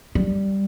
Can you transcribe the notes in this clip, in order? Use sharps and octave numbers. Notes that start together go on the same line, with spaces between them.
G3